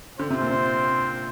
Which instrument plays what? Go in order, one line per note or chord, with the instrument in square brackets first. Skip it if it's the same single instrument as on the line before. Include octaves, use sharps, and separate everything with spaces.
[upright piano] D3 [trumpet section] C4 F4 C5
[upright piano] C3
A#2
C3